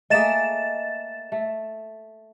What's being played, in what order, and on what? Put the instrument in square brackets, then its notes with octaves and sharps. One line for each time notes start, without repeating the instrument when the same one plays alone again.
[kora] A3 A#3 G#4 [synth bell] D#5 A6 E7
[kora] A3